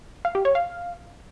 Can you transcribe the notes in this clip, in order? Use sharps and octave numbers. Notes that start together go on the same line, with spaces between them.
F5
G4
C#5
F5